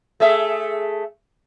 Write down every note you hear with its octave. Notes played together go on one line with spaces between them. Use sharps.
A3 G#4 E5